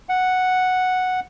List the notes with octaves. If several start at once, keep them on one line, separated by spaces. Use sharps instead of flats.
F#5